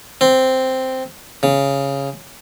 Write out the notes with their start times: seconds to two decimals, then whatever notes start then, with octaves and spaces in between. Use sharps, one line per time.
0.21 C4
1.43 C#3